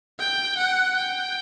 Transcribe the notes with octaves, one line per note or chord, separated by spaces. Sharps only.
G5
F#5
G5